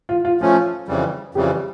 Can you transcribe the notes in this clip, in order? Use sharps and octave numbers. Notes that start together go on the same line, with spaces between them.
F4
F4
F3 A3 C#4 F4
F2 C#3 E3 G3
F2 C#3 E3 G3 G4